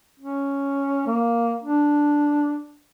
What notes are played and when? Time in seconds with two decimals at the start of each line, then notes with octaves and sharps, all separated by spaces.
0.19 C#4
1.06 A#3
1.63 D4